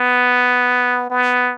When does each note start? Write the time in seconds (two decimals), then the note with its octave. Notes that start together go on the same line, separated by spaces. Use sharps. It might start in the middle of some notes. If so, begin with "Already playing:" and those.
Already playing: B3
1.11 B3